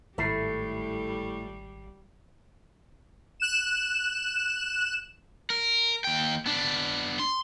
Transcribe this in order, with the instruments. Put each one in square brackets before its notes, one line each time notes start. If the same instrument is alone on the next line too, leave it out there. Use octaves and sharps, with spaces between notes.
[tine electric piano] G#1 C7 [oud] A2 E4 [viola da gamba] G3 [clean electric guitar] A3
[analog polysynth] F#6 E7
[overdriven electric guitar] A#4
D#2 G5
B3 D4
C6